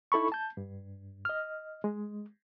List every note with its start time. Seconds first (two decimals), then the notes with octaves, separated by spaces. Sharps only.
0.12 D#4 E4 A4 B5 C#6
0.32 A5 G6
0.57 G2
1.25 D#5 F6
1.84 G#3